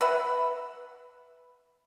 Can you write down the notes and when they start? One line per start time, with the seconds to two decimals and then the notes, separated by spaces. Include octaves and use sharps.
0.01 B4 E5 F#5